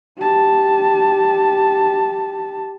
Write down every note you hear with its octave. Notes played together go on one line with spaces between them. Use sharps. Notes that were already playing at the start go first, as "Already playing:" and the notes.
G4 A5